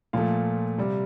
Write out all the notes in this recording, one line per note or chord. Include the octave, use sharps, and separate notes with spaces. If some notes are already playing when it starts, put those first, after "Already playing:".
A#2 F3 A3 F5
C3 G3